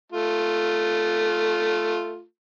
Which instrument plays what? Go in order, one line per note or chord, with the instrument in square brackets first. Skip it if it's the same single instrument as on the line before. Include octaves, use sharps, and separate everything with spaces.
[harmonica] A3 F4